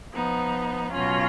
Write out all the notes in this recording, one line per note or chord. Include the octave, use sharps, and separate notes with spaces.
F3 B3 D#4
B2 F#3 C#4 F4